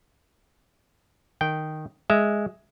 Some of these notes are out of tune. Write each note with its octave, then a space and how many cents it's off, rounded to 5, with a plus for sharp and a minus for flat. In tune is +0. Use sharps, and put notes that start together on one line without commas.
D#3 -10 G5 -10
G#3 +0 E5 +0